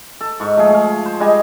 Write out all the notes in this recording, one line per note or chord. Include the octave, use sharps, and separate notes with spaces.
A4
G#2 C#6
F3 A3 G#4
G#4 F5
C5
G3 G#3 D#5 G#5